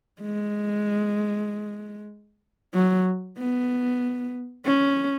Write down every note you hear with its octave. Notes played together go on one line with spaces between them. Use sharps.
G#3
F#3
B3
C#4